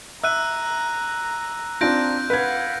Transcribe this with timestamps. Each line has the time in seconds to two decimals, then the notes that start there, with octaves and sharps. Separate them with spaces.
0.23 E5 A#5 E6 F#6 D#7
1.81 C4 D4 F4 G6 A#6 D7
2.30 B4 F5 F#5 G#6